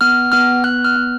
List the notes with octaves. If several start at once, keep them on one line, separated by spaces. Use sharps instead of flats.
B3 F6
B3 F6
B3 F#6
F6
B3